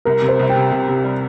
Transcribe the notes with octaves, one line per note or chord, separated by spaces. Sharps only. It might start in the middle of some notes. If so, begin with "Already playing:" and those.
C2 A#4
C3
C5
C2
G5
C3
C3
C3
G3